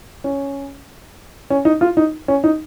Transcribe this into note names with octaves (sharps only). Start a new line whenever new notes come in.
C#4
C#4
D#4
F4
D#4
C#4
D#4